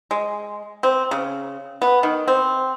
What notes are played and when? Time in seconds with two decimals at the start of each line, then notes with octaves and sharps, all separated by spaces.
0.11 G#3
0.83 C4
1.11 C#3
1.82 B3
2.03 D#3
2.28 C4